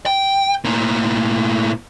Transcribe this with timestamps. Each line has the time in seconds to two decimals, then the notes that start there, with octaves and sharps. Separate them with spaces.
0.06 G5
0.65 A2 A#3